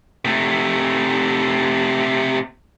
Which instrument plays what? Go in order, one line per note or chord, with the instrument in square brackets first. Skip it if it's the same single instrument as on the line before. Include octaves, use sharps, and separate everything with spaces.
[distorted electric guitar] C3 A3